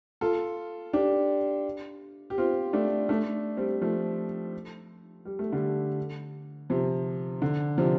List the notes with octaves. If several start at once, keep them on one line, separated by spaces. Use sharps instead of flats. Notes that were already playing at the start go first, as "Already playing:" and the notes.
F4 A4
D4 G4
G4
C4 F4
A3 D4
A3 D4
G3 C4
F3 A3
G3
A3
D3 G3
C3 F3
D3
C3 F3